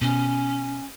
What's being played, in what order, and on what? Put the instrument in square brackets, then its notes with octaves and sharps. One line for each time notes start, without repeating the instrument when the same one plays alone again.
[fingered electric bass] B2 [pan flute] C#4